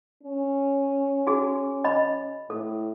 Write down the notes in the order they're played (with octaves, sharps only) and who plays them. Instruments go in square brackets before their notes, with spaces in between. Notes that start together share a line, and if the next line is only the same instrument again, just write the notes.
[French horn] C#4
[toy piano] F#4 G#4
D#5 B5
[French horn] A2 [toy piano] A4